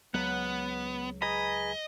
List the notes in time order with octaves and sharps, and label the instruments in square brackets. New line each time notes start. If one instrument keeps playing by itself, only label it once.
[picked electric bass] C#2 F#3 [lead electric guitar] B3 [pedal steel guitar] F#5
[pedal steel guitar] G#4 B4 A#5 [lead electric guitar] D#5